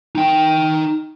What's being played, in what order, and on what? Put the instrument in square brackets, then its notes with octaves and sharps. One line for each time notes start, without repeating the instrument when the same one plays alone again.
[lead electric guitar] D#4 G5